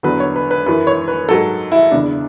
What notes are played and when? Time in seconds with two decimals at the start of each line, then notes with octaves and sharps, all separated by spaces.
0.03 E2 D3 F#3 B4
0.20 C#5
0.36 B4
0.51 B4
0.66 F#2 E3 B4
0.87 C#5
1.08 B4
1.29 G#2 F#3 A4
1.72 E4
1.91 E2 C#3 E3 D4